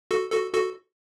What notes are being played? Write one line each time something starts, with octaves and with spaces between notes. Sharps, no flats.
F#4 A4
F#4 A4
F#4 A4